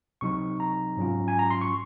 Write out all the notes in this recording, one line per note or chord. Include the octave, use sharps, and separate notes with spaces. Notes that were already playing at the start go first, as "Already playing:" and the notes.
C#2 C3 F#3 C4 D#4 C#6
A#5
G#2 F#3 C#4 F4
G#5
A#5
C6
C#6